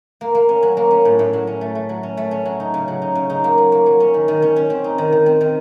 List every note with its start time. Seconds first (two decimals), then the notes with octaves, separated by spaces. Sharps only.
0.21 A#3
0.35 A#3
0.49 C#4
0.63 F#3
0.77 A#3
0.91 C#4
1.05 A2
1.19 A2
1.33 F#3
1.47 C#4
1.61 A3
1.75 A3
1.89 F#3
2.03 C#4
2.17 A3
2.31 C#4
2.45 F#3
2.60 D#4
2.74 C#3
2.88 F#3
3.02 D#4
3.15 C#3
3.30 D#4
3.44 A#3
3.58 F#3
3.72 A#3
3.86 F#3
4.00 C#4
4.14 D#3
4.28 D#3
4.42 C#4
4.56 C#4
4.70 C4
4.84 D#4
4.98 D#3
5.12 D#3
5.26 C4
5.41 D#3